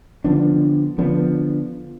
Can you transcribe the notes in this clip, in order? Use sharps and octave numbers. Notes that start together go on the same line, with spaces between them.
D3 F3 B3 D4
D3 F3 B3 D4